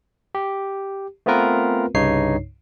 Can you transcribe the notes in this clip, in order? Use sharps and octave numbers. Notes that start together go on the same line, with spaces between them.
G4
A3 B3 C4 F4 A#4 B4
C2 G2 C#3 D#4 C#5 C7